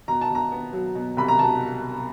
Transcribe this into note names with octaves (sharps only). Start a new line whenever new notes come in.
B2 A#5
A5
B2 A#5
B3
F#3
B2
C2 B5
A#5
B2 A5